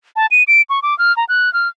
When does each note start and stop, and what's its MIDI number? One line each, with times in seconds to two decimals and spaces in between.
0.16 0.26 81
0.31 0.43 99
0.48 0.62 98
0.70 0.80 85
0.82 0.97 86
0.99 1.15 89
1.17 1.25 82
1.29 1.52 90
1.53 1.68 89